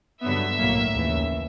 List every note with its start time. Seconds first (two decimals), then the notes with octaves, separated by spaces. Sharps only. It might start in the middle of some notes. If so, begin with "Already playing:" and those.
0.21 G2 D3 F#3 B3 E5
0.58 B1 A2 F#3 A#3
0.95 D#2 C#3 E3